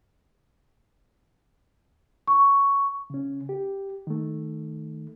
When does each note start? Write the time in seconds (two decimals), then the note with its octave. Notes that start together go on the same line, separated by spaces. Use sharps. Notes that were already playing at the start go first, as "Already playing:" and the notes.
2.28 C#6
3.10 C#3 C#4
3.49 G4
4.07 D#3 A3